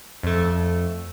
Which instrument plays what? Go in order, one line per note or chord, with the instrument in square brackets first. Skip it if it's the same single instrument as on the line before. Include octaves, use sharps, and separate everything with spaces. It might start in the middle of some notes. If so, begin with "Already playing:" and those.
[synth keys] F2 A3